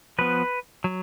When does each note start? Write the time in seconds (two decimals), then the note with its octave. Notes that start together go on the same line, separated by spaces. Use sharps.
0.19 F3 B3 B4
0.84 F#3